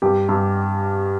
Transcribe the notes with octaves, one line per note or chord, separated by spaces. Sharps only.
G2 G4
G2